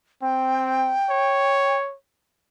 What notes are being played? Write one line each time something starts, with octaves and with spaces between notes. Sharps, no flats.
C4 G5
C#5